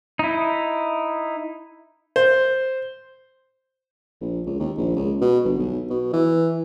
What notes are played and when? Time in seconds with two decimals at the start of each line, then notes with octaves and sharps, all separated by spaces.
0.19 D#4 E4
2.16 C5
4.21 A#1
4.46 C#2
4.60 D#2
4.78 A#1
4.96 C#2
5.21 B2
5.45 G1
5.59 B1
5.90 B2
6.13 E3